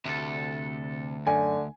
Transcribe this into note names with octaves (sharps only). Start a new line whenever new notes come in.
D2 C3 A4
F#2 D3 G#5